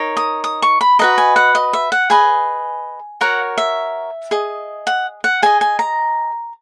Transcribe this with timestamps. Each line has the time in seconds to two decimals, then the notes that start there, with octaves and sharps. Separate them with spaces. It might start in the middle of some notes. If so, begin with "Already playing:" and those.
Already playing: D#4 A#4 C#5
0.17 D#6
0.44 D#6
0.62 C#6
0.81 B5
0.99 F#4 B4 D#5 A#5
1.18 G#5
1.36 F#5
1.55 D#5
1.73 E5
1.92 F#5
2.10 G#4 B4 D#5 G#5
3.21 F#4 A#4 C#5 F#5
3.58 E5
4.31 G#4 D#5
4.87 F#5
5.24 F#5
5.42 G#4 D#5 G#5
5.61 G#5
5.79 A#5